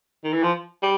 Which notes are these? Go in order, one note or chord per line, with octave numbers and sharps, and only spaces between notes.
D#3
E3
F3
G3